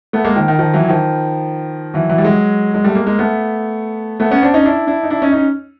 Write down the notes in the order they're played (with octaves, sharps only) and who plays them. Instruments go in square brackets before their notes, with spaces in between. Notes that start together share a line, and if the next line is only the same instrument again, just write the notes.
[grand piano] A3 B3
G#3 A#3
D#3 F3
D#3
D#3 F3
E3 F#3
D#3 F3
E3 F#3
E3 F#3
G3
F#3 G#3
G#3
G3 A3
G#3 A#3
G#3 A#3
A3 B3
A3 B3
B3 C#4
C4 D4
C#4 D#4
D4 E4
D4 E4
D#4
D4 E4
C#4 D#4
C#4 D#4